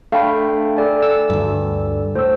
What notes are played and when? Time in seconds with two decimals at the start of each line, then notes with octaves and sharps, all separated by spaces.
0.12 A3 D4 F5 G5 B5
0.77 A4 D5 G#5
1.02 E6
1.30 D2 G2
2.15 A2 C5 E6